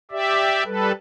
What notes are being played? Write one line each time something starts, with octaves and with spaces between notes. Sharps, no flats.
G4 D5 E5
G3 A4 B4